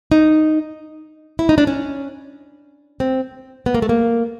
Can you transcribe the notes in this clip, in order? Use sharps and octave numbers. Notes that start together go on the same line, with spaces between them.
D#4
E4
D#4
D4
C#4
C4
B3
A#3
A3
A#3